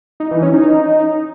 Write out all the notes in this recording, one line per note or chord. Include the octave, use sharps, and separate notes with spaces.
D#4
E3
C#4
D#4